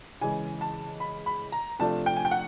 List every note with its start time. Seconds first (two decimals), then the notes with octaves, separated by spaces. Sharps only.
0.21 C#3 E3 G#3 G#5
0.61 A5
1.00 B5
1.26 B5
1.52 A#5
1.79 C3 F3 A3 D4 F4 A5
2.06 G5
2.16 G#5
2.25 G5
2.31 F#5